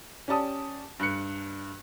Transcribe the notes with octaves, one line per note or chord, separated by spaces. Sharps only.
C#4 G4 D5 A5 D#6
G2 F#6 C#7